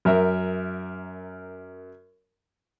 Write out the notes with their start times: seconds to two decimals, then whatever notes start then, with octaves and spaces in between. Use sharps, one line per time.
0.05 F#2 A#4 E5